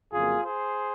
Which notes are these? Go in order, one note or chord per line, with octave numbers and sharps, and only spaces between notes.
F2 C#3 F#3 A#3 F4 G#4
G#4 C5